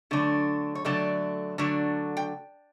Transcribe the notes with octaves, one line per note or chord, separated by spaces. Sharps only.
D3 F#3 A3 D4
C#5
D3 F#3 A3 D4 D5
D3 F#3 A3 D4
G5